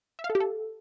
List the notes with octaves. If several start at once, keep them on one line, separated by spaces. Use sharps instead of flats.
E5
F5
A4
G4
A4